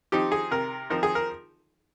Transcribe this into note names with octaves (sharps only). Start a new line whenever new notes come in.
F3 C4 D#4 G4
G#4
C3 A#4
F3 C4 D#4 A#4
G#4
A#4